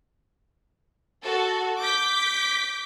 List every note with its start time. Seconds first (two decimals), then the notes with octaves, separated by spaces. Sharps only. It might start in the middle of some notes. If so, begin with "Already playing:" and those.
1.22 F#4 A4
1.80 D6 G6 B6